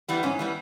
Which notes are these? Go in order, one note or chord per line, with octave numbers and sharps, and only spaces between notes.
E3 G3 B3
G#2 C#4
E3 G3 B3